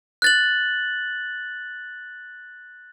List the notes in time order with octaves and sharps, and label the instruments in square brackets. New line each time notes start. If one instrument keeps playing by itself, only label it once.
[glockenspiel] F#6 A6 F#7